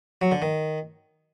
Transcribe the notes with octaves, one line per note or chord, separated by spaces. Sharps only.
F#3
D3
D#3